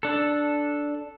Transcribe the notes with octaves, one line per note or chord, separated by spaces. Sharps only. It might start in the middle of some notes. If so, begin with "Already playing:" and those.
D4 A4